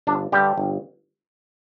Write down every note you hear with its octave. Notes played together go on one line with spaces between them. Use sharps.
G1 D4
G2 D3 G3 G4
G1